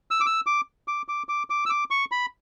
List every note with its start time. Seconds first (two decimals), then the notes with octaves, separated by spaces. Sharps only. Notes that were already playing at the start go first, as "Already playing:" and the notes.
0.11 E6
0.21 D6
0.26 E6
0.47 D6
0.88 D6
1.08 D6
1.29 D6
1.50 D6
1.66 E6
1.70 D6
1.91 C#6
2.12 B5